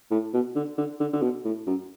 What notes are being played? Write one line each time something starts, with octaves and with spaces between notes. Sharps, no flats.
A2
B2
D3
D3
D3
D3
B2
A2
F#2